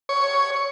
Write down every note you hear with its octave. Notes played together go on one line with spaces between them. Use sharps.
C#5